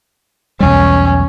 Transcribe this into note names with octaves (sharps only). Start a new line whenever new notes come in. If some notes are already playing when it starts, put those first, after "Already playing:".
B1 E2 G3 C#4